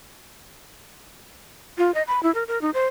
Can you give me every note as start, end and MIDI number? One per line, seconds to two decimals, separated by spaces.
1.78 1.93 65
1.94 2.02 75
2.07 2.21 83
2.23 2.33 64
2.34 2.43 70
2.48 2.61 70
2.61 2.70 63
2.74 2.86 72